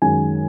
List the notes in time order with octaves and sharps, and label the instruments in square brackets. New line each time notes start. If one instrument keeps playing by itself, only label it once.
[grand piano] F#2 D#3 G#3 G#5